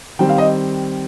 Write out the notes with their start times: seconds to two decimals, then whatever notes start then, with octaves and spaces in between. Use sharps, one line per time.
0.19 D#3 G3 C4 G5
0.29 F5
0.38 D#5